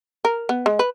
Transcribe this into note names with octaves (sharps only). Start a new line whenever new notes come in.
A#4
B3
G#3
B4